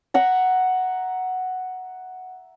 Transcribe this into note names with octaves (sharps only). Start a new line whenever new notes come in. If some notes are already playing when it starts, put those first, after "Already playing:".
E5 F#5 A#5